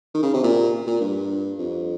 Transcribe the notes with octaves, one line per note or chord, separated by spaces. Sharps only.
D#3
C#3
C3
A#2
A#2
G2
F2